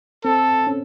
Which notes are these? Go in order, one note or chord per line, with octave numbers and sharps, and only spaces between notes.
C4 A4
C#4